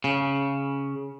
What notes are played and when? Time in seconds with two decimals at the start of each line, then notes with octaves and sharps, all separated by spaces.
0.04 C#3